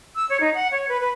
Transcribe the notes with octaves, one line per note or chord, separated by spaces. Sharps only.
E6
C#5
D#4
F#5
C#5
B4
B4